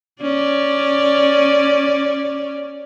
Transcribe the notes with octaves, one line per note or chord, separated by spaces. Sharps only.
C#4 D5